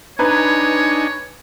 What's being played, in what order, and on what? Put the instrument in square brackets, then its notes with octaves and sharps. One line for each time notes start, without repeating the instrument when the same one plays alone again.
[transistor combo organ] D4 D#4 G#5 [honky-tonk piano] B4 A#5 [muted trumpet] C#5